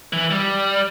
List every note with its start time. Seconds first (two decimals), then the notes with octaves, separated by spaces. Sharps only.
0.13 E3
0.30 G3